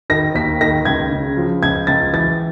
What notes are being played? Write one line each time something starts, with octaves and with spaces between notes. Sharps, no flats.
D#3 A#6
D#2 B6
D#3 A#6
C#2 G#6
C#3
F3
C#2 G#6
C#2 A6
E3 A6